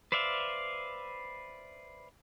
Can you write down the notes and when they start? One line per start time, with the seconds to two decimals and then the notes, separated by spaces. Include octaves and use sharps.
0.12 B4 C5 D5 E5 F5